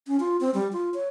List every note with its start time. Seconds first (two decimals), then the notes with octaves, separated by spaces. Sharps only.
0.08 C#4
0.20 F4
0.41 C4
0.54 G3
0.73 F4
0.94 C#5